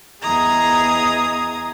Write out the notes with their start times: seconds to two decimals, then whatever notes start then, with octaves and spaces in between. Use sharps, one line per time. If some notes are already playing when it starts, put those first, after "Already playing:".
0.23 E2 G#4 D#5 A#5 D#6 G#6